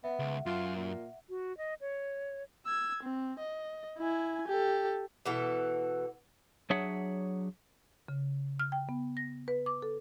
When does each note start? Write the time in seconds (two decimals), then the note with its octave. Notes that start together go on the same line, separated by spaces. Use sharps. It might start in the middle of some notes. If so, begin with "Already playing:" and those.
0.04 B3 E5 F#5
0.19 C#2
0.46 F#2 F4
0.76 A#2
1.29 F#4
1.57 D#5
1.81 C#5
2.66 E6 G#6
3.03 C4
3.39 D#5
3.98 E4 G#5
4.48 G4 A4
5.26 B2 E3 A4
6.70 F#3 D4 G#4 C#5 E5 F#5
8.08 C#3
8.60 F6
8.72 G5
8.89 B3
9.17 A#6
9.48 B4
9.66 D6
9.82 A4